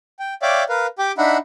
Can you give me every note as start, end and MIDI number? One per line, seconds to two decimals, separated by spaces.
0.19 0.34 79
0.42 0.64 73
0.42 0.64 74
0.42 0.64 76
0.42 0.64 77
0.42 0.64 79
0.42 0.64 86
0.69 0.87 70
0.69 0.87 71
0.69 0.87 77
0.99 1.12 67
0.99 1.12 79
0.99 1.12 86
1.18 1.38 62
1.18 1.38 63
1.18 1.38 76
1.18 1.38 78
1.18 1.38 83